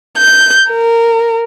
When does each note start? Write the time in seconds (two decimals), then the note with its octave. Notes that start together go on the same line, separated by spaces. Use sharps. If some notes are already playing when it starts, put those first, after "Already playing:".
0.18 G6
0.71 A#4